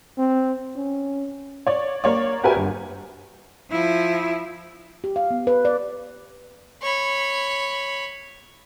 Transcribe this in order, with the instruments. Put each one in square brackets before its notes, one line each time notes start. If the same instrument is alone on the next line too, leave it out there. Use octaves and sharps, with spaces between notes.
[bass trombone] C4
C#4
[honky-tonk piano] C#5 D5
A#3 C#5 D5
F#4 G4 A#4 B4 E5 G#5
G1
[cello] F3 E4
[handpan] G4
F5
B3
B4
D5
[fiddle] C#5 B5